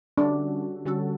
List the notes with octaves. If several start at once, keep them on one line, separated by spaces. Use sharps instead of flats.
D3 G3 C#4 D4 F#4 A4
D3 G3 C#4 F#4 A4